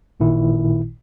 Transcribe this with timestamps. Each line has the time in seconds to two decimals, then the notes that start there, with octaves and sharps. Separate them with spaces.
0.20 A1 A#2 D#3 E4